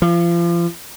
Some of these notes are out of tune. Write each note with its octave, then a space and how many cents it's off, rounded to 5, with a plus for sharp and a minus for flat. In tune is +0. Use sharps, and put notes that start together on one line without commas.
F3 -35